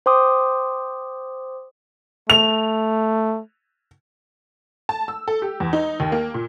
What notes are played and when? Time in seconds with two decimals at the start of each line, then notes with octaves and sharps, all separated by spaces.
0.06 C5 G5 C6 D6 D#6
2.30 A3 F7
4.89 A5
5.08 E6
5.28 A4
5.42 G4
5.60 E2
5.73 D#4
6.00 D#2
6.12 A#3
6.34 A#2